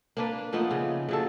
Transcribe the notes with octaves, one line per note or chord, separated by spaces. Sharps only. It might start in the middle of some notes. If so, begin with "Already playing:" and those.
A#3 D4 B4
F3 A3 B3 D#4
C#3
C#3 F#3 A4